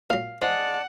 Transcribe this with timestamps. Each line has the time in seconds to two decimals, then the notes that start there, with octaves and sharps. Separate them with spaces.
0.10 A#2 F#3 F5
0.42 G#3 C5 D5 F#5 A5